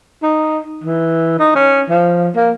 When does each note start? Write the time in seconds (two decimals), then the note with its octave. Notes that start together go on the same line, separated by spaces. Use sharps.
0.23 D#4
0.84 E3
1.39 D#4
1.55 C#4
1.90 F3
2.36 A#3